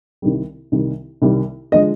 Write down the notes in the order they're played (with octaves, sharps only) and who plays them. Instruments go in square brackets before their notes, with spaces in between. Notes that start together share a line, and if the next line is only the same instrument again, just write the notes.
[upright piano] C2 C3 D#3 G3
C2 C3 D#3 G3
C2 C3 D#3 G3
D3 F3 G#3 D#5